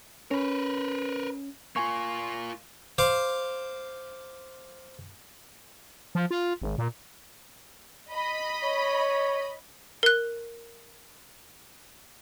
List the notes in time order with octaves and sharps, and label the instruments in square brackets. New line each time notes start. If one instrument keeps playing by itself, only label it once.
[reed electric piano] C#4 [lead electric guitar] A#4 B4
[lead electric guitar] A#3 F4 [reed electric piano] G#5 C#6
[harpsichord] C5 F5 D6
[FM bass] F3
F4
G#1
A#2
[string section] D#5 B5
[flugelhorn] C#5
[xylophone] A#4 F#6